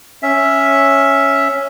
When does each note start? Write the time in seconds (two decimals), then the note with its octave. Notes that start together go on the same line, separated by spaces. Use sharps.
0.23 C#4 E5